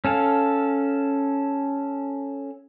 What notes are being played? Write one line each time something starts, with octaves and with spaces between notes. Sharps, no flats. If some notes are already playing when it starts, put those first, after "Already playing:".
C#4 A4 F5